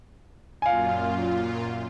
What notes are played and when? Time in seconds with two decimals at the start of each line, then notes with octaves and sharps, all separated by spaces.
0.62 F#2 A#2 F4 F5 G#5